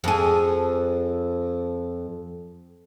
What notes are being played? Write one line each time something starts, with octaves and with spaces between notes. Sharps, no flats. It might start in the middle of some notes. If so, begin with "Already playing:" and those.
F2 G#4